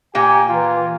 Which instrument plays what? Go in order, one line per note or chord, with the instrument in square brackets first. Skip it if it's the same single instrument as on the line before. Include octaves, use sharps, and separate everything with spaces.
[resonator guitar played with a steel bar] A#2 A#3 G5 [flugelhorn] G4 [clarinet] G#5
[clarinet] E3 [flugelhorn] F4